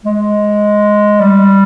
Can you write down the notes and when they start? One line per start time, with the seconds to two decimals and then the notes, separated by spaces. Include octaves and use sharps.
0.06 G#3
1.20 G3